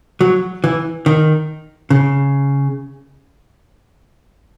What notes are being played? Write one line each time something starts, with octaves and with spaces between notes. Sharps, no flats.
F#3
E3
D#3
C#3